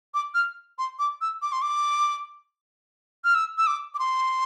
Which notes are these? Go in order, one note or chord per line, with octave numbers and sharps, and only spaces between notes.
D6
F6
C6
D6
E6
D6
C6
D6
F6
E6
E6
D6
D6
C6